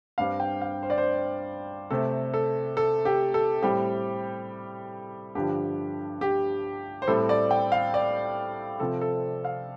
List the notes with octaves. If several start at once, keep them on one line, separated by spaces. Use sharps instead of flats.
G2 G3 C4 F5
G5
F5
C5
D5
C5
C3 A3 C4 A4
A4
A4
G4
A4
A2 G3 C4 G4
G2 D3 F3 G4
G4
C5
A2 G3 C4 A4
D5
G5
F5
D5
C3 F3 C4 A4
A4
F5